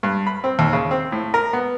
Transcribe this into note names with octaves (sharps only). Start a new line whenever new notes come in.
G2
B5
C4
D#2
C#3
C4
A2
A#4
B3